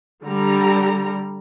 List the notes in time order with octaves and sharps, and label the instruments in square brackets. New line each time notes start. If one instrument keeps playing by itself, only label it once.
[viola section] D3 G3 A#5